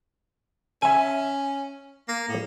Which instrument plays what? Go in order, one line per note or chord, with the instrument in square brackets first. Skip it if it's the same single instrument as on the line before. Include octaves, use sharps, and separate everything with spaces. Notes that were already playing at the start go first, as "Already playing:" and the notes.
[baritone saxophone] C#4 [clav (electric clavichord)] E5 G#5
[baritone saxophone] A#3
A2